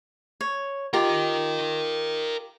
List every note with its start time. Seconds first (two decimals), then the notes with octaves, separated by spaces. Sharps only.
0.41 C#5
0.93 F4 G4 A#4 D#5 A#5